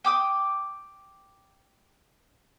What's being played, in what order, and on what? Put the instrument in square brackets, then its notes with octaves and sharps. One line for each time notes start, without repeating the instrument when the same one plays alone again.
[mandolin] G5 D6 D#6